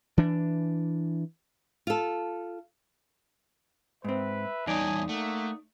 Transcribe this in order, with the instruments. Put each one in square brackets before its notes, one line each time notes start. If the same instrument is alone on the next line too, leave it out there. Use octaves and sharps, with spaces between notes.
[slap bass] E3 D4
[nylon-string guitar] F4 A4
[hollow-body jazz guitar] G#2 C4 [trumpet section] B4 E5
[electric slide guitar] E2 G3 C#5 [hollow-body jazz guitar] D#4 D5 [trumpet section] G#5 A5 D#6
[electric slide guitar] A3 [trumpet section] A#3 F#5 D#6